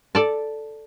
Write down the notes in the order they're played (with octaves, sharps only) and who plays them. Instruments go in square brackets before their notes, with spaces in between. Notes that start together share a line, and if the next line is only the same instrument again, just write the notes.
[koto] A4 D5 A5